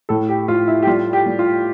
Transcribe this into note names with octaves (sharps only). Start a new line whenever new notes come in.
A2 A4
G4
A2 F4
E4
G4
G3 F4
G4
G3
F4